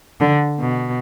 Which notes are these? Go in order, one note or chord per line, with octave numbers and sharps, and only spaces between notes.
D3
B2